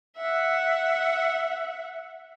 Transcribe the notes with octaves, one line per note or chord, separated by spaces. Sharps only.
E5 F#5